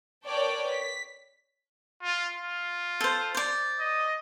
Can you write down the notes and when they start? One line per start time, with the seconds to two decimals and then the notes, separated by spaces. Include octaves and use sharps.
0.24 A#4 B4 C#5 D5 G5 A5
0.68 B6
2.03 F4
2.34 F4
3.01 A4 C5
3.35 C5 D5
3.79 D#5